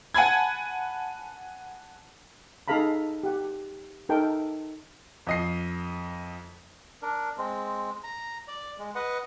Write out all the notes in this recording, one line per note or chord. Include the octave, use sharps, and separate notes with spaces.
F#5 G#5 A5 B5 G#6
D#4 G#4 A4 F5 A#5 B5
G4 F#5
D#4 A4 A#4 G5
F2 D#5 C7
D4 A#4
G#3 C4
A#5
D5
G#3
B4 D#5 F#5